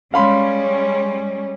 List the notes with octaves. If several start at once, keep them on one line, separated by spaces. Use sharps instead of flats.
G3 G#3 C#4 F5 B5 C6